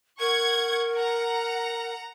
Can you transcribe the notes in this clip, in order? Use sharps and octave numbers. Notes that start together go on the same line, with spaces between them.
A#4 F#5 C#6 G#6
F#5 A#5